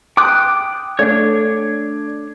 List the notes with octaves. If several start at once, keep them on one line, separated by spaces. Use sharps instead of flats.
G5 D6 D#6 F#6
A3 D4 C#5 D5